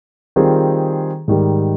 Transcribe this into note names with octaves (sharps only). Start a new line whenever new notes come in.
D#3 G3 C4 F4 G#4
G#2 D#3 G3